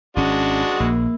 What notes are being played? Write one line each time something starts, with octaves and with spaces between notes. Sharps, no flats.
G#1 G#3 C#4 D4 F#4
A#1 A#3